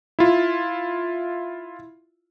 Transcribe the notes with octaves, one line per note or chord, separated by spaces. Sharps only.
E4 F4